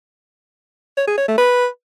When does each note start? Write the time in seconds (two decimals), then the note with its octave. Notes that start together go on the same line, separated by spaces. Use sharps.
0.97 C#5
1.07 G#4
1.18 C#5
1.28 A3
1.38 B4